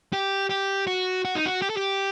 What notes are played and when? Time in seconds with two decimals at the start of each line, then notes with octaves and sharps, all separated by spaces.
0.13 G4
0.50 G4
0.87 F#4
1.25 F#4
1.35 D#4
1.46 F#4
1.62 G4
1.70 A4
1.77 G4